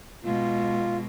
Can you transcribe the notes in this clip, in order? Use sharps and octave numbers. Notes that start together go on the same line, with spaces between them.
B2 G#3 F4